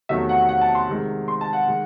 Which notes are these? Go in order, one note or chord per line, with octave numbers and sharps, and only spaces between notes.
E2 C3 D#3 F#3 A3 E5
F#5
F#5
A5
C6
C3 D#3 G#3
C6
A5
F#5
D#3 G#3